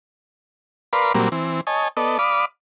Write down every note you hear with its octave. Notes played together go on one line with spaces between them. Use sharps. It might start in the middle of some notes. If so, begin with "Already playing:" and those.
A#4 B4 D5 F5 B5 C6
A#2 F#3 G3 A#3 C4
E3 C4
C#5 D#5 G#5 A5
B3 A4 D5 D#5
D5 F5 B5 D6 D#6